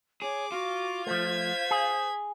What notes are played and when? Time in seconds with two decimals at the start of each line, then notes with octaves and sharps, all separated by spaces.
0.22 G#4 C#5 D6
0.52 F4 F#4
1.07 F3 A3 C5 G#6 B6
1.71 G#4